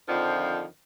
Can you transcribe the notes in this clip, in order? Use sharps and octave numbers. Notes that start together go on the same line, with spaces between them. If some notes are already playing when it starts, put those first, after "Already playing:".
F2 D3 D#3 F3